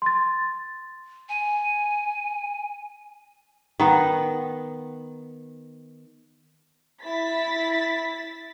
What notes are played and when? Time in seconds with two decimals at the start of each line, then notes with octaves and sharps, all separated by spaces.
0.02 C6 A6
1.29 G#5
3.80 D#3 B3
7.05 E4 A6 B6